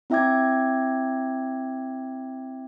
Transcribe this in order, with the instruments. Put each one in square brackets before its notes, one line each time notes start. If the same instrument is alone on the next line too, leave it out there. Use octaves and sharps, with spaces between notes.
[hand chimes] C4 E4 E5 G5 D6 G#6